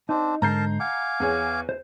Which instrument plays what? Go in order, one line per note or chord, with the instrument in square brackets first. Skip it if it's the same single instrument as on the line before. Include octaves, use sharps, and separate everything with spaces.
[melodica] C4 D4 [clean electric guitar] D#4
[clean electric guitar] G#2 D3 [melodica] A#4 A5 [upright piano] A#5 G6 C7
[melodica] F5 G#5 D6 [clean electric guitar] F#5
[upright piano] E2 G#4 C#5
[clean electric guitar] C5